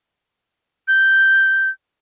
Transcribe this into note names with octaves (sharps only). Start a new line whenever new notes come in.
G6